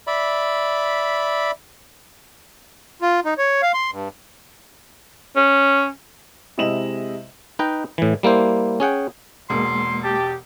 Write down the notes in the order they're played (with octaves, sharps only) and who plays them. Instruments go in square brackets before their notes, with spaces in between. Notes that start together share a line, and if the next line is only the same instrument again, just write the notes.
[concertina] D5 E5 B5
[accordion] F4
D#4
C#5
F5
C6
G2
[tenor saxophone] C#4
[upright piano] C3 G#3 E4 D#5 E7 F#7
[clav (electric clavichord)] D#4 B4 D#5 G5
A2 E3
G3 A#3 E4 C5
C#4 G#4 F#5 G5
[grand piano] E1 B2 [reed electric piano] G#3 A#3 [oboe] C6
[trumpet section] G4 [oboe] A5